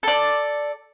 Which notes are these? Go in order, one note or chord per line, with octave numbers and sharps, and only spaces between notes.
A4 D5